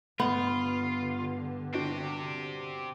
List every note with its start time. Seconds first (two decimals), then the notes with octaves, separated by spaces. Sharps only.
0.20 G2 D3 B3 F4
1.74 C4 D4 F#4 G4